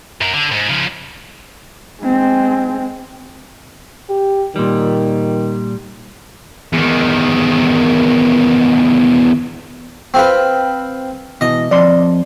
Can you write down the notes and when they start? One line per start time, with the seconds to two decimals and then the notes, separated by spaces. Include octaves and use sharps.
0.21 F#2 A#4
0.34 D3
0.52 G#2
0.69 C#3 F3
2.03 G#3 C4
4.10 G4
4.56 A#2 D#3 G3
6.73 E2 D#3
10.14 C4 F4 B4
11.41 B2 E3 D#5
11.71 F2 D5 C6